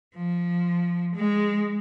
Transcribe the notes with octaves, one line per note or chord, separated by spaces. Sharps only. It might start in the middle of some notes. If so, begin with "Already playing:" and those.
F3
G#3